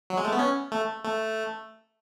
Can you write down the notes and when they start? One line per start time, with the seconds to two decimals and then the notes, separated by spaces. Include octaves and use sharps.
0.10 F#3
0.17 G#3
0.25 A3
0.33 B3
0.39 C#4
0.72 A3
1.05 A3